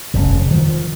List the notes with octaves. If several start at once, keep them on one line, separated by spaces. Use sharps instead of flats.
F1 C#3
D#3 F3